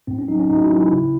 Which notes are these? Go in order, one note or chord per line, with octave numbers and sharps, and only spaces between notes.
A2 C4
C#4
F#3 D#4
C#4
A2 D#4
F#4
E4
F#3
E4
C#3